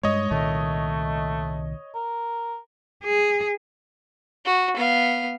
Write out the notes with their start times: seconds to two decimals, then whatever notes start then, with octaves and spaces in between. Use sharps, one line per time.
0.03 G2 G#3 C#5 D#5
0.31 C2 A#2 D#3 A3
1.95 A#4
3.04 G#4
4.45 F#4
4.76 B3 F5